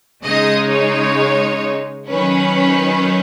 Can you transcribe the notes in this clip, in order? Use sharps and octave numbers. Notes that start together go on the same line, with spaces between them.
C#3 G#3 D#4 D#5
C#5
D#3 F#3 C#4 B4